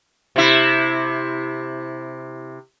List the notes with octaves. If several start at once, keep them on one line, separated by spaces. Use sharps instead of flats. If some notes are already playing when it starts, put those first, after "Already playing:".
C3 E4